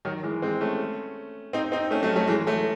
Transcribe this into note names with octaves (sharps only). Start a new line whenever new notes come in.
D#3 F#3
E3 G#3
G#3 C4
A3 C#4
C4 D#4
C4 D#4
A3 C#4
F#3 A3
F#3 A3
E3 G#3
F#3 A3